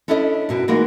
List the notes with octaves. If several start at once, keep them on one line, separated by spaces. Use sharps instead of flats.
C#4 D4 E4 A4 B4 D#5
F#2 B2 E4
E3 G#3 A#3 D#4 F#4